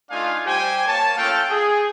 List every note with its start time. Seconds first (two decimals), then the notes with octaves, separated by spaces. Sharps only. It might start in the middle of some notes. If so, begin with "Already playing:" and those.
0.11 A3 D4 D#4 F4 F5 G#5
0.46 G3 G4 C5 G5 G#5
0.86 A#3 C#5 A5
1.17 A3 C#4 F4 A4 F5 G5
1.49 G#4